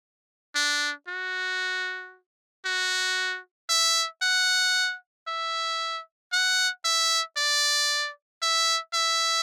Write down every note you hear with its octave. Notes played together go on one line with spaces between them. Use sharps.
D4
F#4
F#4
E5
F#5
E5
F#5
E5
D5
E5
E5